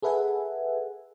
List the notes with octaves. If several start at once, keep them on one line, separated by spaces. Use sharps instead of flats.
G#4 A4 B4 E5 F#5 G#5